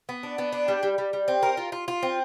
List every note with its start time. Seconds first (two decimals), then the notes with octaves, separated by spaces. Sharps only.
0.09 B3
0.23 D4
0.38 B3
0.52 D4
0.68 G3
0.83 G3
0.98 G3
1.13 G3
1.28 C4
1.43 A#4
1.57 F4
1.72 F4
1.88 F4
2.03 C4